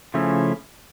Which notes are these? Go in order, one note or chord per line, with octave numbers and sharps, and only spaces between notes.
C#3 F3 A3 C#4 E4